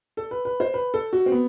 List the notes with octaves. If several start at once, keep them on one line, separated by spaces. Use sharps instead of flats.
A4
B4
B4
C5
B4
A4
F#4
C4
B3